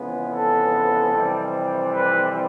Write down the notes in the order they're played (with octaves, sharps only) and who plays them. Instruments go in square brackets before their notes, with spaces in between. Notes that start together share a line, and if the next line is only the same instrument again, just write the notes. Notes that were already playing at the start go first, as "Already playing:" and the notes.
Already playing: [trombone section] F2 C#3 E3 G#3 B3
[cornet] A4
[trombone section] F2 C3 E3 G3 C4
[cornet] B4